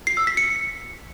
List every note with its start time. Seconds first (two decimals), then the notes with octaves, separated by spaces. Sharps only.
0.07 C7
0.17 E6
0.27 B6
0.37 C#7